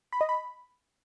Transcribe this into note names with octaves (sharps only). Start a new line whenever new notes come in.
B5
D#5
B5